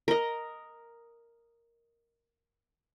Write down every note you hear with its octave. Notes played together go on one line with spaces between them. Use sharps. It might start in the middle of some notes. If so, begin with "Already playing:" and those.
A#4 D#5